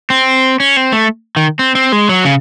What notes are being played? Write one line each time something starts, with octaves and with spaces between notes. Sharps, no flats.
C4
C#4
C4
A3
D#3
C4
C4
G#3
F#3
C#3